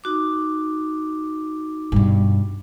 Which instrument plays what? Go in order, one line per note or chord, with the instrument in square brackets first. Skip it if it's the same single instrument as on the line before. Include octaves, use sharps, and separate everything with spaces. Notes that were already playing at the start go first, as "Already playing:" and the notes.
[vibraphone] D#4 F#4 D6
[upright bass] G2 B2